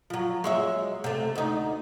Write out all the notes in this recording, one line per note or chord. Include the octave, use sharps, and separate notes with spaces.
F3 F#3
G#3 C#5 E5
C3 A3
D2 D#4